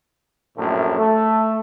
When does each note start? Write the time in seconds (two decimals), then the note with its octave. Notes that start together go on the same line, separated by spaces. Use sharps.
0.57 A#1 F#2 A2
0.98 A3